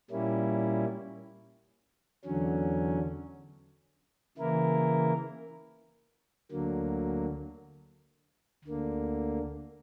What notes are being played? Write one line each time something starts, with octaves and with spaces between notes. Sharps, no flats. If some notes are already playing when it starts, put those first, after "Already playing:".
A#2 G3 A#3 C#4 E4
E2 D3 F#3 C#4
C#3 E3 A#3 E4 A#4
D2 D3 F#3 A#3
D2 D3 A#3